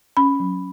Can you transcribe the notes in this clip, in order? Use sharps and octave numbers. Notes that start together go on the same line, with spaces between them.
C#4 B5
F#3